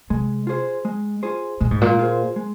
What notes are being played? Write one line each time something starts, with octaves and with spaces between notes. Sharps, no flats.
C3 G#3
F4 G#4 C5
G#3
F4 G#4 C5
A#2 G#3
G#2
A#2
F4 G#4 C5
G#3